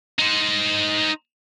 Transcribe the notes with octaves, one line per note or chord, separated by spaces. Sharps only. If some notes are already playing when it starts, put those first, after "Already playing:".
D#4 C5